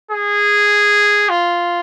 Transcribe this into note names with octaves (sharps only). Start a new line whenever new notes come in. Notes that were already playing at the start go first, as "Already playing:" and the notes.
G#4
F4